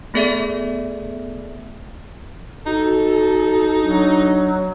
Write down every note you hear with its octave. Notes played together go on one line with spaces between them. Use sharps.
A3 B3 G#4 A4 D5 E5
D#4 F#4 A4
F#3 D4